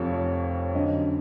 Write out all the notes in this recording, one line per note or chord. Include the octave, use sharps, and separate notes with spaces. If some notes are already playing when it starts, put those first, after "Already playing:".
Already playing: F1 F2 F3 C#5 F5
C#5
F#2 D3 F#3 D#5